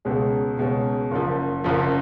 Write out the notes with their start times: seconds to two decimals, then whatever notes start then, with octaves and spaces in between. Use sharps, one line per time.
0.05 C#2 B2 G#3 C#4
0.57 C#2 B2 G#3 C#4
1.11 F#1 F#2 F3
1.64 F#1 F#2 F3